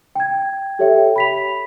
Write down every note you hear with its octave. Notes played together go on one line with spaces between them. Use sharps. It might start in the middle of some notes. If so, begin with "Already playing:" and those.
G5 G#6
G4 A4 C#5 E5 G5
B5 B6 F7